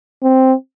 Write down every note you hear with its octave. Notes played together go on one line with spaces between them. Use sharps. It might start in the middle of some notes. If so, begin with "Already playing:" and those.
C4